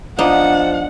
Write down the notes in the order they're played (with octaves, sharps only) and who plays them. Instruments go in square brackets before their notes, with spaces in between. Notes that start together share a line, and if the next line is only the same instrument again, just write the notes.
[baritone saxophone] F3 [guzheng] B3 D4 D#4 [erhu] F#5